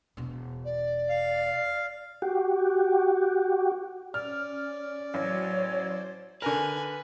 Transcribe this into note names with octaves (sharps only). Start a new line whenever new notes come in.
E1 B2
D5
F5
F#4 G4
C#4 D5 F6
A1 F#3 C5 C#5
D3 A#4 B4 G#5